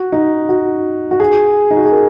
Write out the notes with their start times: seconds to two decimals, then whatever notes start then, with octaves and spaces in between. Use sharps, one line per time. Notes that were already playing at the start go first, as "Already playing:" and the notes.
Already playing: F#4
0.12 D#4
0.49 F#4
1.11 F#4
1.20 G#4
1.71 D#4
1.77 F#4
1.85 G#4
1.92 A#4